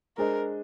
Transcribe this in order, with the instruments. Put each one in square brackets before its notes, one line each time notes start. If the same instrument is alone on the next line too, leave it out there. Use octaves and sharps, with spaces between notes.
[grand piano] G#3 D4 G#4 C5 D#5 [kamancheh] A#4